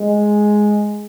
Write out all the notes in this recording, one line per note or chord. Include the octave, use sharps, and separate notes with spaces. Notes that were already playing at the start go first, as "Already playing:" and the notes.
Already playing: G#3